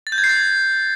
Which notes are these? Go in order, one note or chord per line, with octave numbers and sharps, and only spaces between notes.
A6
G6
G#6
C7
A6